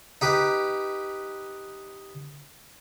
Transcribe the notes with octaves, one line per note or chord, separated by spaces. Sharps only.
D#4 G4 B4